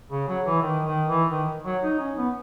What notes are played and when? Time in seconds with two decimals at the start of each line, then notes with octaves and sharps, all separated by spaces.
0.11 C#3
0.28 F#3
0.46 E3
0.63 D#3
0.85 D#3
1.08 E3
1.31 D#3
1.65 F#3
1.83 D#4
2.00 C#4
2.17 B3